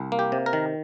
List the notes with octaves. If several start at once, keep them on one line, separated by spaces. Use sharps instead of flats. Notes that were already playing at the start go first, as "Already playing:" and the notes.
Already playing: C2
A#3
G4
C3
A#4
D#3